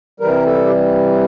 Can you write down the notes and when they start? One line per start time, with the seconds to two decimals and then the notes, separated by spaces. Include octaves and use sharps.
0.20 C3 E3 G3 A#4
0.46 A4
0.67 G4